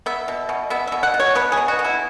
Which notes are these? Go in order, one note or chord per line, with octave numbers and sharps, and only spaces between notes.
B3 E5
B2
B2
B3 E5
B2 E5
F#5
B2
C#5
B3 B4
G#4
B2
F#4
B3
E4